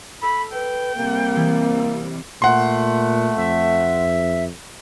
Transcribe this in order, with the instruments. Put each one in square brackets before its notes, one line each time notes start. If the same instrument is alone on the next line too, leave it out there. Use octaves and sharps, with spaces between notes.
[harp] A4 [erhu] B5
[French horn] B4 [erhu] G5
[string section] C3 G3 [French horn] A#3
[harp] E3 G#3
C4
[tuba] A#2 [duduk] A3 [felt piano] F#5 C6
[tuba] F2 [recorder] E5